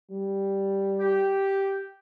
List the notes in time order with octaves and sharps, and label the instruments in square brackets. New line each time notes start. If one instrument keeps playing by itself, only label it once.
[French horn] G3
[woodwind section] G4